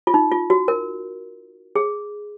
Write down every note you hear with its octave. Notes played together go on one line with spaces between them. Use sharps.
F4
D#4
F4
F#4
A#4
G#4